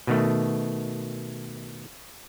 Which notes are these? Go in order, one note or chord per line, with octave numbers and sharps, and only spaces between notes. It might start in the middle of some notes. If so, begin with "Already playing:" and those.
B2 D#3 A3